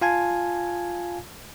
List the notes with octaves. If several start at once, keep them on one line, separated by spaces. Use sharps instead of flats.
F4 F5 G#5 A5 G#6